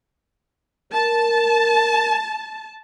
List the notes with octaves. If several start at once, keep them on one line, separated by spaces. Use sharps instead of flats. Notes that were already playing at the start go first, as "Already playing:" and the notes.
A#4 A5